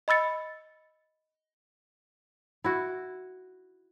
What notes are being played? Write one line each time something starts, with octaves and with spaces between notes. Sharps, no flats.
D#5 B5 E6 A6 C#7
E4 F#4